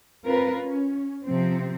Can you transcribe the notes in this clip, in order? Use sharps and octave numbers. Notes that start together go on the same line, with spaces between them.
C4 F4 A#4 B4
C#4
C3 F3 C4